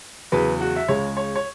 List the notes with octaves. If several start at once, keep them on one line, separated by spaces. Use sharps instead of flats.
E2 C#3 F#3 B4
F#4
E5
C#2 C#3 G#3 C#5
C#5
C#5